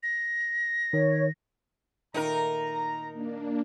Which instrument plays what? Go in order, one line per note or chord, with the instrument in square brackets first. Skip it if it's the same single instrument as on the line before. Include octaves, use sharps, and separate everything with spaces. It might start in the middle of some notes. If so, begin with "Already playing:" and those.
[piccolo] A#6
[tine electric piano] D#3 [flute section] C#5
[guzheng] A#2 D#3 A3 [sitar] D#4 A#4 [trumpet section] A#5
[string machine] A#3 D4